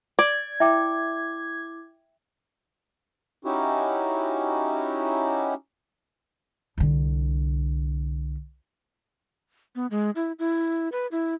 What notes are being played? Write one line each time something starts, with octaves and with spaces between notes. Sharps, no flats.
D5 G#6
E4 E5 G5 D6
C#4 D#4 E4 F#4 G4
C2 D3
B3
G#3
E4
E4
B4
E4